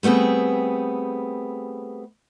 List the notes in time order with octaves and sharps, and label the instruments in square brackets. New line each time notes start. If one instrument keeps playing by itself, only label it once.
[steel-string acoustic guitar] G3 A3 B3 C4 G#4